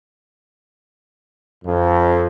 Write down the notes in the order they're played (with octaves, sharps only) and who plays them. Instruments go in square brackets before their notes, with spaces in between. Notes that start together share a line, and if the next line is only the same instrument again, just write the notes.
[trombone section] F2